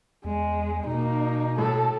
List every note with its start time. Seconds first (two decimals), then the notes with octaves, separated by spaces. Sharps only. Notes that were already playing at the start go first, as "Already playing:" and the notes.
0.25 E2 G#3
0.86 B2 A#3 D#4
1.58 A2 A4